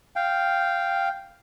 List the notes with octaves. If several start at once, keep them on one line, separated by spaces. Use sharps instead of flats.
F5 G5